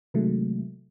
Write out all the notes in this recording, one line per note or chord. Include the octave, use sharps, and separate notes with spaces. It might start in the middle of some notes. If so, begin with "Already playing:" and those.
C3 D#3 F#3 G#3 A3